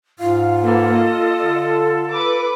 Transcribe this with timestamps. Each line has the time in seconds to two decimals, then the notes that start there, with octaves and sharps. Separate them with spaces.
0.19 G#2 F4 F5
0.63 A#3 B3 A4
0.94 D#5
1.43 D3
2.11 B4 D6